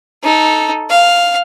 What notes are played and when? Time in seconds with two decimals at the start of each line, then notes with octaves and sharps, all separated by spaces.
0.23 D#4 A4
0.90 F5